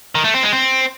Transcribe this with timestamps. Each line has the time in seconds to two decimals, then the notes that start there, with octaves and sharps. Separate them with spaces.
0.15 D#3
0.24 A3
0.34 C4
0.43 G#3
0.53 C4